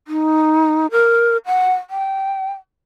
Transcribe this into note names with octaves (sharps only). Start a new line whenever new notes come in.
D#4
A#4
F#5
G5